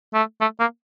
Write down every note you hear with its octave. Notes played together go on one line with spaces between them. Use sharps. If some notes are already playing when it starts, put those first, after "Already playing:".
A3
A3
A#3